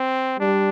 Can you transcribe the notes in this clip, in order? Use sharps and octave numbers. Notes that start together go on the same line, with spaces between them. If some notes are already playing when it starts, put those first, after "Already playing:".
Already playing: C4
G3 D4